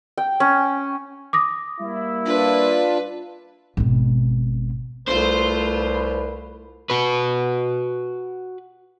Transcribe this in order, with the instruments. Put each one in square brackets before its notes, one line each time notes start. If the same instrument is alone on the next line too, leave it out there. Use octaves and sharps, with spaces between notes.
[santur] G5
C#4
[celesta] D6 D#6 A#6
[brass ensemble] G3 A#3 E4
[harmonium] D4 F4 [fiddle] B4
[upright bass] G#1 B2
[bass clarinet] C2 [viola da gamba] A3 F4 [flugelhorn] B4 [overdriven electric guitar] C5
[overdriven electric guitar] F#4 B4